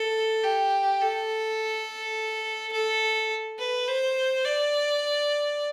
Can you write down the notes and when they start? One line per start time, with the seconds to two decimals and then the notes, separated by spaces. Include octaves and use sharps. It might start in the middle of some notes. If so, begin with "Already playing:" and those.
Already playing: A4
0.44 G4
1.01 A4
2.72 A4
3.59 B4
3.88 C5
4.45 D5